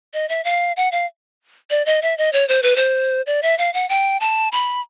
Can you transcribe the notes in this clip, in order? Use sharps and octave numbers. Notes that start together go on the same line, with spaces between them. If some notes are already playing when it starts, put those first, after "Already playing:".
D#5
E5
F5
F#5
F5
D5
D#5
E5
D#5
C#5
C5
B4
C5
D5
E5
F5
F#5
G5
A5
B5